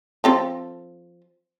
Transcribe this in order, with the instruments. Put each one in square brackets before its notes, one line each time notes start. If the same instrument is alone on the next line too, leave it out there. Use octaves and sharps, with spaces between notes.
[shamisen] F3 C4 A4